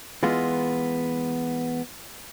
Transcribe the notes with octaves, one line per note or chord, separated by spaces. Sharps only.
E3 G#3 B3 F4